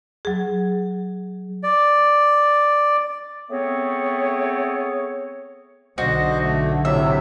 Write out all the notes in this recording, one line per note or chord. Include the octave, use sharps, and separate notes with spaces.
F#3 G#4
D5
A3 B3 C4 G#4 C#5
B1 D3 F#4 C5 D#5
A3
A2 C3 F#3 E5